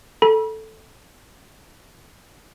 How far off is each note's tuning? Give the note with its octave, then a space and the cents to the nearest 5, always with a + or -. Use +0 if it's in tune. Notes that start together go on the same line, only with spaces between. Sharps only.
A4 +0 B5 -40